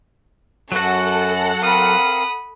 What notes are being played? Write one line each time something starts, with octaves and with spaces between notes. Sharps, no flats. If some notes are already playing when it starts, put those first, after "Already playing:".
F#2 F#3 F#4 A4 F#5
C4 A#4 F5 B5 D#6